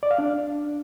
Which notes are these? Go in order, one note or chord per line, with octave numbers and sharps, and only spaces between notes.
D5
F5
D4